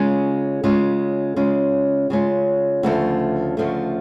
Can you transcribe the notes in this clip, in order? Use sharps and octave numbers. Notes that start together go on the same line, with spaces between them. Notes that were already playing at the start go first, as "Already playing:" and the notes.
Already playing: C#3 G#3 C#4 F4
C#3 G#3 C#4 F4
C#3 G#3 C#4 F4
C#3 G#3 C#4 F4
D2 C#3 F3 A3
D2 C#3 F3 A3